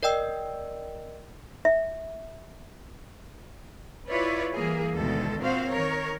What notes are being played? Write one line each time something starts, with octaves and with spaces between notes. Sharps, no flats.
A#4 D5 D#5 G5 E6
E5
E4 F4 B4 C#5 D5
E3 G3 A#3 G#4
D2 B2 D#3 G#3 A4
A#2 C4 F#4 C5 F5
D#3 A#4 C#5